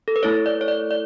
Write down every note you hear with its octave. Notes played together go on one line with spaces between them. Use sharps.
A4
B4
A3 E4 A4 C#5
D5
C#5
D5
D5